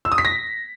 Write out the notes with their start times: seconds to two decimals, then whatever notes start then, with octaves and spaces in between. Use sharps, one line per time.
0.05 E6
0.12 D#6
0.18 B6
0.25 A#6